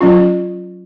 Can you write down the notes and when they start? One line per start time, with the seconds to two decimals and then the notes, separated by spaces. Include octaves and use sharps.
0.01 F#3 C#4 F4